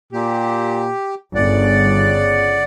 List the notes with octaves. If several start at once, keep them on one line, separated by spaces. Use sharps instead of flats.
A#2 G4
G1 C#3 D5 F#5